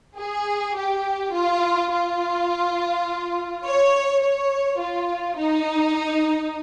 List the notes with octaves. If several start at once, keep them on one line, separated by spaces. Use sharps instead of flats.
G#4
G4
F4
F4
C#5
C#5
F4
D#4